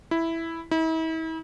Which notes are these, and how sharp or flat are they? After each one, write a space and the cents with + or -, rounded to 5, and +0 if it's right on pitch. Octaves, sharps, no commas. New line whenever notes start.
E4 +0
E4 -40